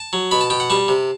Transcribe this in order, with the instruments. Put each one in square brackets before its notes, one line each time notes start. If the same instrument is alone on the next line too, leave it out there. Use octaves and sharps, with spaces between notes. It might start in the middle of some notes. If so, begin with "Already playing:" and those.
Already playing: [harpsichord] A5
F#3
B2 B5
A5
B2 G5
F#5
G3 A5
C3